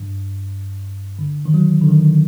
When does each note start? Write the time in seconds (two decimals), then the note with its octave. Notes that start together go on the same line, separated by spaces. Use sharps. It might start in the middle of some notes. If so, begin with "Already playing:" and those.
Already playing: G2
1.19 D3
1.46 D#3
1.54 F#3
1.81 D3
1.89 D#3